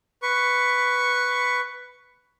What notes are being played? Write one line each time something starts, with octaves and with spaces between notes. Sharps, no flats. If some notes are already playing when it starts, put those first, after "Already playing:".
B4 C#6